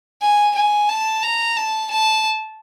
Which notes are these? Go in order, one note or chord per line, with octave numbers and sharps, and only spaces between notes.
G#5
G#5
A5
A#5
A5
A5